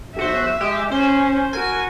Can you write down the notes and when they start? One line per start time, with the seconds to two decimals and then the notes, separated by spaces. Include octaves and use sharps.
0.17 B1 F#4 C5 E5
0.61 G#3 G4
0.92 C#4 C5
1.53 F#4 A#4 G#5